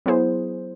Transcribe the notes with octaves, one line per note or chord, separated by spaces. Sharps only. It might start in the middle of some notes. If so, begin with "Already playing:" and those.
F#3 B3 E4 G#4 C5